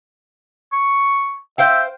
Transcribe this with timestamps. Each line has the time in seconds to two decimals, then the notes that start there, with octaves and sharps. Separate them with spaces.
0.73 C#6
1.58 C5 E5 F5 G5